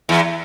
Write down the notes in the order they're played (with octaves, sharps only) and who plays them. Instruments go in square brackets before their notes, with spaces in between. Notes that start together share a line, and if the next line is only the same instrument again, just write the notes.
[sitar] E2